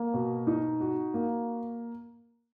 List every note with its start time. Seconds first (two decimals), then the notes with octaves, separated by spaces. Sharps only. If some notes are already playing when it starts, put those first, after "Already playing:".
Already playing: A#3
0.14 B2
0.47 D#4
0.80 F#4
1.14 A#3